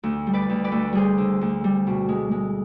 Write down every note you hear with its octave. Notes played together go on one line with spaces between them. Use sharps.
D2
G3
B4 D5
D2
B4 D5
D2
G3 G#4 C5
D3
D2
G3
B2
G#3
G#3